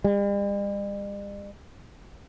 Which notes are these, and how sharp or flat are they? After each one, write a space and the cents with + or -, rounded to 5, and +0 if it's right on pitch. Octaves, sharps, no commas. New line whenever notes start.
G3 +45